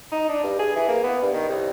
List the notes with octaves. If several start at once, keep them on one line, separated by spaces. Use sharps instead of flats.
D#4
D4
G2
G#4
E3
A#3
B3
G2
D#3
C2